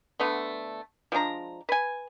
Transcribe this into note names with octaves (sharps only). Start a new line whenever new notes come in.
D3 A3 B3
F3 G#3 D4 A#5
B4 G#5